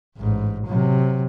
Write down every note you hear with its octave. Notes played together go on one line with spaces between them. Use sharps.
A1 G#2
C3 F#3